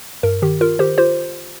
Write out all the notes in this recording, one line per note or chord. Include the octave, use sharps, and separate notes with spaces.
G2 A#4
D#3 G4
F4 A#4
D#3 G4 C5
F4 G4 C5